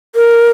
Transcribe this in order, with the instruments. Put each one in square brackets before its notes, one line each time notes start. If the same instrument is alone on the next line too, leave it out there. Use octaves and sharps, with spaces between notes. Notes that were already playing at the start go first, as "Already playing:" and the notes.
[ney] A#4